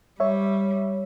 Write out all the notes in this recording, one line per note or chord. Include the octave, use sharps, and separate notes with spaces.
G3 C#5 E5